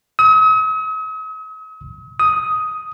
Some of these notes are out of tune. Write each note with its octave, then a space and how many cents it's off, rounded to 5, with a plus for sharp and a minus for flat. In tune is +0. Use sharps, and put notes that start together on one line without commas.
D#6 +45
D#6 +10